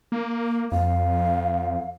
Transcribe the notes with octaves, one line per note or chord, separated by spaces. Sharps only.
A#3
F2 F5